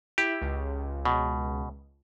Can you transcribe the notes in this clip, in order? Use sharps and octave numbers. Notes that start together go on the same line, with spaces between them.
E4 G4
C#2
B2